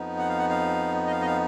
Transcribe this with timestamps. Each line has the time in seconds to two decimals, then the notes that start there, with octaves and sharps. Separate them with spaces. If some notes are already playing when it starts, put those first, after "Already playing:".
Already playing: F2 F3 B3 D#4
0.18 F#5
0.29 F5
0.38 F#5
0.50 F5
1.07 D#5
1.11 F5
1.21 D#5
1.26 F5